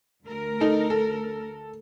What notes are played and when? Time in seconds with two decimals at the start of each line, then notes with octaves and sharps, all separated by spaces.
0.25 D2 A#4
0.60 D#4 A4
0.90 A4